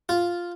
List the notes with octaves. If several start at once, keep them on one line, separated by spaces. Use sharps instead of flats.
F4